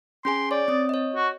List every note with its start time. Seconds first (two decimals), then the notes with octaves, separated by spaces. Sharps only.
0.25 C#4 G#4 G#5 C6
0.51 C#5 D5
0.68 C4 D#6
0.89 C#5 D#5
1.16 F#4